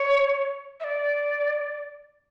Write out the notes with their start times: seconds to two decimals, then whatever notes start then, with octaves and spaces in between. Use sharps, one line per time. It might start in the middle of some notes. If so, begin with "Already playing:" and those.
Already playing: C#5
0.80 E5
0.84 D5